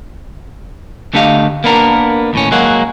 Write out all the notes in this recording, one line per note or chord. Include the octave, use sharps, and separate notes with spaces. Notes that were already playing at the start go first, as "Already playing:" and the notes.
D2 D3 A3 G4 D#5 F5
A#3 B3 D4 A#4
D#2 A2 C#4
F#3 G#3 A#3 F#4